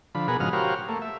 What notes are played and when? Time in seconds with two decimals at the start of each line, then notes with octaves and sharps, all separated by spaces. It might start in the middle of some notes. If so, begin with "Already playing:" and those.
0.15 D3 F3 B5
0.28 B2 G#4 A#4 F#5 B5
0.40 G#2 C#3 F3 F#4 D#5 F6
0.53 F#4 G4 A#4 C5 C#5 F5
0.89 A3 A#3
1.02 E5